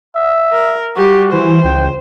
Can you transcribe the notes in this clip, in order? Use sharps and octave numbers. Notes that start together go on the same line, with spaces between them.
E5
A#4
G3 F#4 G4
E3 C5
C#2 G5